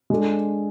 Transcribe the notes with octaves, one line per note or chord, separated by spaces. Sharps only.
G#3 D4 A4